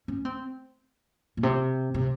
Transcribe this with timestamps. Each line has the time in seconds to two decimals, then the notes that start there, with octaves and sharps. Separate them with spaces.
0.08 C#4
0.25 C4
1.37 A#2
1.43 C3
1.94 C3